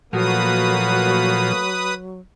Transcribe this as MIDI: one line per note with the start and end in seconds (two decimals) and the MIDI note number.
0.13 1.52 46
0.13 1.52 53
0.13 2.19 54
0.13 1.60 57
0.13 1.60 58
0.13 1.60 66
0.13 1.94 71
0.13 1.94 87